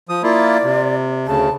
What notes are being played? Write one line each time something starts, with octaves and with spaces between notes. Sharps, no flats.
F3 D#6
A#3 E4 F4 D5
C3
D2 C#3 A5